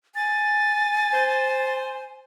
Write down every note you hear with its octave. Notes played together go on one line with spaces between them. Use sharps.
G#5 A6
C5